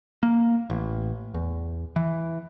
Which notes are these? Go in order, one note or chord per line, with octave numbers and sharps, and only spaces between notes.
A#3
A1
E2
E3